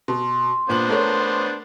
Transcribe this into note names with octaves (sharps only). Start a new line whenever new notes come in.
B2 C6
A#2 B3 D4 C5 F#7
A3 A#4 C#5